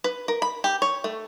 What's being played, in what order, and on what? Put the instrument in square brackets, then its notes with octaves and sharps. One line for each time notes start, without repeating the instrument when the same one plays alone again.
[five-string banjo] B4
A#4
B5
G4
C#5
A3